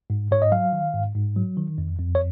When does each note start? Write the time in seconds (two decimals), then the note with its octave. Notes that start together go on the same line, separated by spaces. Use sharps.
0.10 G#2
0.31 G#2 C#5
0.42 D#5
0.52 F#3 F5
0.73 D#3
0.94 G#2
1.15 G#2
1.36 F#3
1.57 D#3
1.78 F2
1.99 F2
2.15 C#5